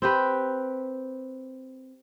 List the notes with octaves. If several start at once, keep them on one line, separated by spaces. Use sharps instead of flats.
C4 G4 B4